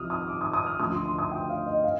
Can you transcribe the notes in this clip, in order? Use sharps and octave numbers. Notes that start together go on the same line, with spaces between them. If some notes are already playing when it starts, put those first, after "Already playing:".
Already playing: C2 C3 F3 D#6 F6
D#6
D6
D#6
D#6
F6
D2 D3 F3 D#6
C6
C6
D#6
G5
F5
D#5
F5